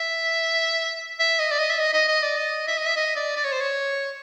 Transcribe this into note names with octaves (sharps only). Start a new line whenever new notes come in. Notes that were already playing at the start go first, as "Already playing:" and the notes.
Already playing: E5
E5
D#5
D5
D#5
E5
D#5
D#5
D#5
D5
D#5
E5
D#5
E5
D#5
D5
D5
C#5
C5
C#5